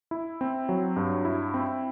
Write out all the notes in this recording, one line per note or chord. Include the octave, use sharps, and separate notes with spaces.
E4
C4
F#3
G2
E4
C4